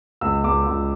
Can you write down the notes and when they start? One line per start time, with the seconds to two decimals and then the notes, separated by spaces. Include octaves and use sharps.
0.21 C#2 E6
0.43 C#2 D6
0.66 C#2